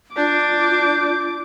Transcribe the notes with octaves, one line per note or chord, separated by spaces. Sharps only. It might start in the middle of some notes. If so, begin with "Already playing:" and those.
D4 F4 D6 G6